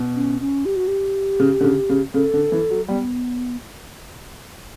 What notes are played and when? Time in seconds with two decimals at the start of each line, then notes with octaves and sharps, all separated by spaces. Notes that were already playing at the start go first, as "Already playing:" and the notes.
Already playing: B2
0.16 C#4
0.41 C#4
0.65 G4
0.76 F#4
0.88 G4
1.40 C#3
1.61 D3
1.64 C#3
1.89 C#3
2.14 C#3 A4
2.33 D3
2.52 E3
2.70 F#3
2.88 G3 B3